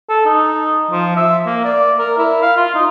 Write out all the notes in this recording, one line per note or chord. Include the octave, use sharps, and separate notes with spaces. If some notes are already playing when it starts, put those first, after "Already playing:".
A4
D#4
F3
E5
A#3
D5
A#4
E4
F5
F4
D#4